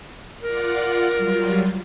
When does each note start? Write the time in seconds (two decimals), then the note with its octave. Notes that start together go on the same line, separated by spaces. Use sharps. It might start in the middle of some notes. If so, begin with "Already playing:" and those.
0.43 F4 A#4 D5 F#5
1.16 F#3 G3 F4